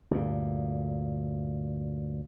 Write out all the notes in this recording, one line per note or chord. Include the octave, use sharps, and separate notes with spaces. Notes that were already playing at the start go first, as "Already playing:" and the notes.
D2 G2 A#2